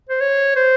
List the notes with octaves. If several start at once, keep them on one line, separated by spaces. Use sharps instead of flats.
C5
C#5
C5